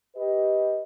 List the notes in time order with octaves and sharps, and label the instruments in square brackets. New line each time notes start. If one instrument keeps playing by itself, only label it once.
[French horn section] G4 B4 D#5